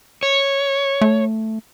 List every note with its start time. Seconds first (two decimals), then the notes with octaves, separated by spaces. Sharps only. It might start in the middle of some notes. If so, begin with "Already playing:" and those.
0.23 C#5
1.01 A3